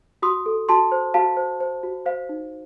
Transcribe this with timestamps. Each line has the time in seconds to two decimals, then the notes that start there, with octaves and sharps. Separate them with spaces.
0.22 F#4 C6 D#6
0.46 A4
0.69 F#4 A5 C6
0.92 C5
1.14 F#4 F5 A5
1.37 C5
1.60 C5
1.83 F#4
2.06 C5 F5
2.29 D#4